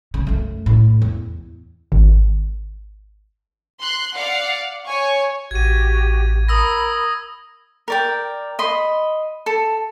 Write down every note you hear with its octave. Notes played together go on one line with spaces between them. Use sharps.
C#3
F#2 A3
A2
E2
G#1
C6 F#6
D5 F5 F#5
C#5 G#5 C#6
A1 F#4 G4 G#6 D#7
A#4 B5 D#6 E6 A#6
A#4 D5 G5
D#5 B5 C6
A4